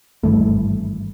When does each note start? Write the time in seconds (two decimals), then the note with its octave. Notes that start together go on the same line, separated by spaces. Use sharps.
0.23 G#1 G2 E3 A3